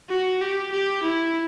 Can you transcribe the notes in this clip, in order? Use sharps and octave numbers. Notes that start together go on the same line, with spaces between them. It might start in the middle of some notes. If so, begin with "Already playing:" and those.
F#4
G4
G4
E4